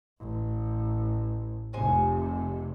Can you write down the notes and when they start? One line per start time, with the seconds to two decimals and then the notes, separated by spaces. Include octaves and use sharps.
0.19 A1
1.73 F1 C3 G#3 C5 G#5